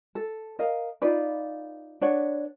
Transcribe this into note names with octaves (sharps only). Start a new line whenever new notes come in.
A4
A#4 D#5 F5
D#4 F4 B4 D5
D4 B4 C#5 F#5